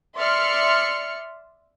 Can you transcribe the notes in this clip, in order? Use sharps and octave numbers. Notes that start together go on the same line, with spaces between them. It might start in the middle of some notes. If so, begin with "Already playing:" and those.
D5 E5 C6 F6 C#7